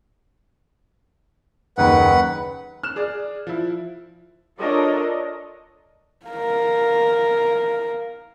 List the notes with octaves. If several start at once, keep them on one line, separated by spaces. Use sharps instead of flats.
F#1 D#2 B4 F#5
F6 F#6 E7
G#4 D5
F3 E4
D4 F4 A4 A#4 C#5 D#5
A#4 F5